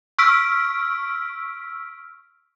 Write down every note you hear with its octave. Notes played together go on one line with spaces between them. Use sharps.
C#6 E6 F6 B6 D7